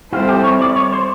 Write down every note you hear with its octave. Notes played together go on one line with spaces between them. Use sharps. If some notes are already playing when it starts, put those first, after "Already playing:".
G3 C4 E4 F4 A4 C5
G4
C#5
D5
C#5
C5